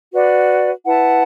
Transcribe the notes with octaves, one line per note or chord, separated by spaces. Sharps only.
F#4 B4 D5
E4 B4 F#5 A5